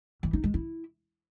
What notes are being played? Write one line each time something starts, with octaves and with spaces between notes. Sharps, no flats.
E3
D#4
G#3
E4